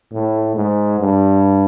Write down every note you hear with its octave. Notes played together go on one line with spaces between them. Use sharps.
A2
G#2
G2